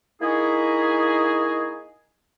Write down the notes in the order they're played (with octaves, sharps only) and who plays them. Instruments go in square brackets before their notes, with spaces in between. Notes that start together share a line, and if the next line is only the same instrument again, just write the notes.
[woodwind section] A#3 D#4 E4 F#4 G#4